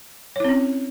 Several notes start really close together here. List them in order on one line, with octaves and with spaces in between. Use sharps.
C#5 E4 C4 C#4